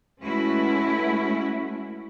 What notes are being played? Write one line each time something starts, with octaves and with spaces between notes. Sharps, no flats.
G#3 A3 C#4 E4 F#4 B4